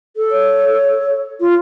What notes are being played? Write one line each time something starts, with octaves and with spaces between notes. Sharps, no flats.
A4
C#5
F4